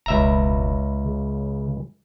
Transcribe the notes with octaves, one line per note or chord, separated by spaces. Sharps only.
E1 C#2 E5 A#5
C#3